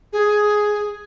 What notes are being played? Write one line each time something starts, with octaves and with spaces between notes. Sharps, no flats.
G#4